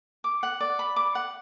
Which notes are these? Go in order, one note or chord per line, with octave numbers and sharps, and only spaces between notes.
D6
F#5
D5
B5
D6
F#5